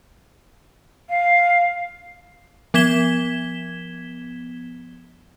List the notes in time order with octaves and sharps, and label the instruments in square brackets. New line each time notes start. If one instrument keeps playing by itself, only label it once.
[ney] F5
[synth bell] F3 B3 G#6 B6 E7 G7